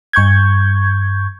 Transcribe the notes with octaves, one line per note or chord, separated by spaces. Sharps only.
G2 C#6 G6 G#6